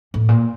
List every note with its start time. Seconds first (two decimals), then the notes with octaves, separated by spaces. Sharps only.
0.14 A2
0.28 A#2